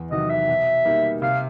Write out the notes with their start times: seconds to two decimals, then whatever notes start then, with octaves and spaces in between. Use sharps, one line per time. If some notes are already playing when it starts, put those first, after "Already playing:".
Already playing: E2
0.11 C3 D#3 F#3 D#5
0.30 E5
0.48 B2
0.85 G3 A#3 D#4
1.22 C3 F5